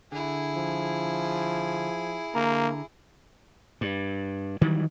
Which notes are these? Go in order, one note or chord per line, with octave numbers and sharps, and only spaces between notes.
D3 E4 G#4
F3
D3 A#3 A#5
G2
D#3 E3 F#3 G3